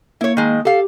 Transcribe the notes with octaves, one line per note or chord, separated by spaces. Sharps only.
A#3 E4 C#5
D#3 G#3
G4 A4 F5